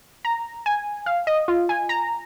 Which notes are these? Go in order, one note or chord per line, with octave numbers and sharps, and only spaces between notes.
A#5
G#5
F5
D#5
F4
G#5
A#5